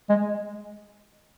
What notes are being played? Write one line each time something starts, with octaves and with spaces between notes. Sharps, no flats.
G#3